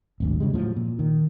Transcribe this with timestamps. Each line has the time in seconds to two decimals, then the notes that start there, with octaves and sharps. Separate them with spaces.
0.20 D1 G#1 D2
0.40 C#3 G3 G#3
0.54 A2 F3 F#3
0.76 A#2
0.99 D#3